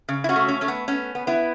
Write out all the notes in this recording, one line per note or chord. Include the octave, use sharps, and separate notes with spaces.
C#3
E4
C#4 F#4
A3
C#4
A3 C#4
B3
B3 C#4
B3
B3 E4